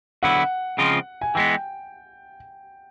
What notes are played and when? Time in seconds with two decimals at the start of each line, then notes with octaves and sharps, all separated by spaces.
0.23 D3 F#3 B3 E4 F#5
0.78 C#3 F3 G#3 C4 F4
1.21 G#5
1.35 E3 G#3 B3 G5